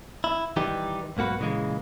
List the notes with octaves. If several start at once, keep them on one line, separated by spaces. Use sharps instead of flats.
E4
D#3 E3 G3 D#4 G4
B1 G#2 A#3 F#4 B4
A#2 C#3 E3 G#3 A#3